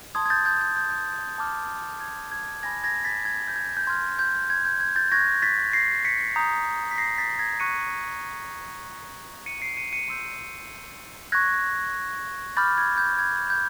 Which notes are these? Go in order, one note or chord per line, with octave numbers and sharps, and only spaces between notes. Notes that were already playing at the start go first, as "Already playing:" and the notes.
A5 C6 D#6 G#6
G#6
G6 A6
G6 A6
G6
G6
A5 D6 F6
G#6
G#6
G#5 B5 D6 G#6 A#6
G#6 A#6
A6 B6
G#6
G6
G#6
G6
C6 F6 G#6
G6
G#6
G6
G#6
G6 A6
C#6 F#6 G#6 A#6
A6 B6
A#6 C7
B6 C#7
A#5 D#6 G6
B6
A#6 C7
A6 B6
G#6 A#6
C#6 F#6 C#7 D#7
C#6 F#6
C#7 D#7
C7 D7
C#7 D#7
C#7 D#7
C6 E6 G6
C#6 F#6 G#6 A#6
B5 D6 F6 G6 A6
G#6
G6
G#6
G6